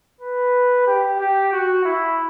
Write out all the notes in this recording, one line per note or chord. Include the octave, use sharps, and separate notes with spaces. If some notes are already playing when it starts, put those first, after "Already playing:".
B4
G4
G4
F#4
E4